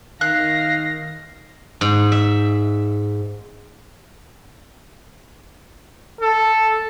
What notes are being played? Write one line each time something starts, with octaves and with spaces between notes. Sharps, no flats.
D#3 F5 F#6 A#6
G#2
E5
A4